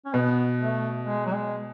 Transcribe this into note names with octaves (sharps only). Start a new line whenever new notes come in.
C#4
B2 B3
A3
G#3
F#3
G#3